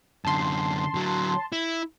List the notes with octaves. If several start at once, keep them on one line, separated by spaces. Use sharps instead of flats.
F#2 D3 A5 C6
D3 F#3
E4